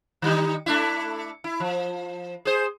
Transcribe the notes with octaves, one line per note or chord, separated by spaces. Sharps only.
D#3 G3 D#4
A3 D4 E4
E4
F3
G#4 C5